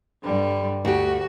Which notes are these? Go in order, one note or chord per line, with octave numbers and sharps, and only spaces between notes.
G2 D3 G3
D2 F#4 G4